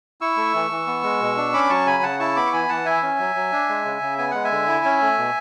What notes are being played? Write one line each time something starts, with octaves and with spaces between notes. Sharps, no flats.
E4 C#6 E6
A3
E3
E3
B3
G#3
B2
D4
C#4 B5 D6
F#3 A5 C#6
C#3 G#5 B5
C#3 F#5 A5
E4 A5 C#6
B3 B5 D6
C#6
E3 G#5 B5
E3 F#5 A5
E4 E5 G#5
C#4
F#3
F#3
D4
G#3
C#3
C#3
B3 G#5
G#3 F#5
E5 G#5
D3
E4
C#4
A3
B2